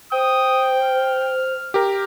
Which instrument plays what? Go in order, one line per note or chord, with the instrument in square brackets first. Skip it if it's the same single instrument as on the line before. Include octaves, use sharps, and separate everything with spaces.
[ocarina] C5 [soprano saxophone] G5 [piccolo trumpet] D#6
[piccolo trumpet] F6
[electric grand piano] G4 A#4